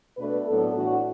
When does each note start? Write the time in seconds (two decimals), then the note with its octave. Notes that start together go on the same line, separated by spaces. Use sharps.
0.17 B2 A3 D4 B4
0.46 A2 F#3 B3 D4 A4
0.74 A2 E3 D4 F#4